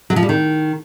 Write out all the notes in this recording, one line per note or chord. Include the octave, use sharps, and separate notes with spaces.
F#3
F3
G3
D#3